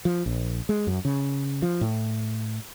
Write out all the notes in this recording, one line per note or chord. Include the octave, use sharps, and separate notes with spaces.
F3
A#1
G#3
F#2
C#3
F3
A2